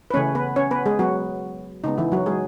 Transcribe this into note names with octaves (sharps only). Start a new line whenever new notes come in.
B4
C#3 E3 A3 C#4 C#5
B3 B4
C#4 C#5
B3 B4
G#3 G#4
F#3 B3 F#4
C#3 G#3 B3 D#4
E3 E4
F#3 F#4
G#3 G#4